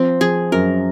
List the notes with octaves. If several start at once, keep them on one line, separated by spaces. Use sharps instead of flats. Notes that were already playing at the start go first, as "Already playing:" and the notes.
Already playing: F3 C4
F3 G#4
F#2 A#4